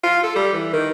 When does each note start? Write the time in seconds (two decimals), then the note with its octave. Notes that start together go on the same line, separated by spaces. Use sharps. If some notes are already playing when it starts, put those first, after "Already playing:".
0.04 F4
0.23 A4
0.35 G3
0.53 E3
0.73 D#3